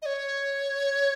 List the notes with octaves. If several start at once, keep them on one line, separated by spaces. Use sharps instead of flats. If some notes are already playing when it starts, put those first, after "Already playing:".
D#5
C#5